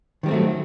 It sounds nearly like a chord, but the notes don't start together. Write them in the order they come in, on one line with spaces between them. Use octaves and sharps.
D#3 G3 C4 A3 F#3